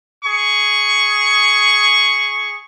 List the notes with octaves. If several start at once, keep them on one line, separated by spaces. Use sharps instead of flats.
G#4 C#6